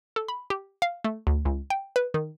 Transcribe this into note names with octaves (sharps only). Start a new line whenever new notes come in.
A4
B5
G4
F5
A3
D2
C#2
G5
B4
D#3